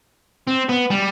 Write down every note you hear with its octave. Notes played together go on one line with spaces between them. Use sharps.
C4
B3
G3